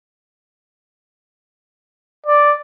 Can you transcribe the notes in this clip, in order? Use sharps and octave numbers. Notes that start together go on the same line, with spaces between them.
D5